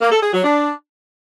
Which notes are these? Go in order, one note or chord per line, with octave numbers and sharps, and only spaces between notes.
A#3
A4
G#4
F#3
D4